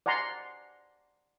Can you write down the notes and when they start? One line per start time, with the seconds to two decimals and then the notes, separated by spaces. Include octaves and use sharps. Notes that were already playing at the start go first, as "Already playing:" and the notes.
0.06 D5 F#5 G#5 A#5 C6